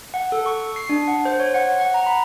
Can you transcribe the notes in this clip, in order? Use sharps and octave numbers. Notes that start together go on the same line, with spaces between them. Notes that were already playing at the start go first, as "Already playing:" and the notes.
F#5
A4
C#6
C7
D4
F#5
C5
C#5
F#5
F#5
A#5
B5